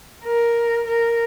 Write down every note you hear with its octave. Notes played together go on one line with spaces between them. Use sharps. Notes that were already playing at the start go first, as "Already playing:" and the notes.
A#4
A#4